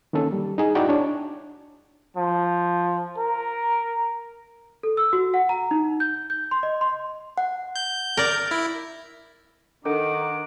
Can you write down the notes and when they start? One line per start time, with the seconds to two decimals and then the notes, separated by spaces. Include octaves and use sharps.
0.13 D#3 A#3 C#4 A4
0.32 G3
0.58 D#4 G#4
0.75 D#4 E4 F#4 D5 G5
0.89 D4 C#5
2.17 F3
3.18 A#4
4.83 A4
4.97 E6
5.13 F#4
5.34 F#5
5.49 A#5
5.71 D#4
6.00 G6
6.30 G6
6.51 C6
6.63 D#5
6.81 C6
7.38 F#5
7.76 G6
8.17 A#4 D5
8.51 E4
9.85 D#3 D4 A4 A#4 D#5 F#5 D6